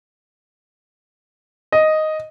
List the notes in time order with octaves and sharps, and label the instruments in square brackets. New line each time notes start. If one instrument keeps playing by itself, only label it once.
[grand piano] D#5